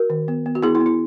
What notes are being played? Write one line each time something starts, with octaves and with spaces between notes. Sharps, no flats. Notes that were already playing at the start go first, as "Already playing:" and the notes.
Already playing: F#4 A#4
D#3
B3
B3
F#4
B3 E4 G#4
E4
B3
E4